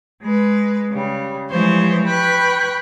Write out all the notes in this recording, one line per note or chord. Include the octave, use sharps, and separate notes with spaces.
G#3 B4
C#3 G3
E3 F3 G3 G#3 C5 C#5
B4 G5 B5 C#6 F#6